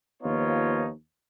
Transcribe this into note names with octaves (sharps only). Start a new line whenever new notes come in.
D#2 F3 B3 D#4 F4 C#5